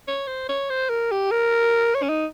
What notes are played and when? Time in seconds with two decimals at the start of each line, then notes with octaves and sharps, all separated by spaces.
0.08 C#5
0.27 C5
0.49 C#5
0.69 C5
0.89 A#4
1.11 G4
1.31 A#4
1.95 C#5
2.03 C#4
2.09 D#4